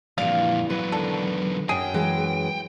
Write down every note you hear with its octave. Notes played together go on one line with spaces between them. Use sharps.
F2 A#2 E3 G3 D4 F5
E2 F#3 B4
D3 D#3 A4
F#2 F#3 G#4 G5
E3 G#3